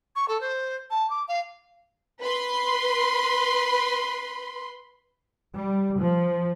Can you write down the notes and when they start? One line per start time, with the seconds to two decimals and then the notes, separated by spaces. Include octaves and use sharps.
0.15 C#6
0.28 A4
0.41 C5
0.90 A5
1.10 D6
1.28 F5
2.20 B4 B5 C6
5.56 G3
6.00 F3